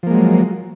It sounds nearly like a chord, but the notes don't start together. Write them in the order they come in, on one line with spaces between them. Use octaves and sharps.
F3 A#3 G#3 F#3